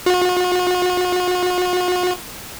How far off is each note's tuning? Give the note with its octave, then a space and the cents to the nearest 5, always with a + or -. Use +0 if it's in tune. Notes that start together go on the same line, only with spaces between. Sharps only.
F#4 -45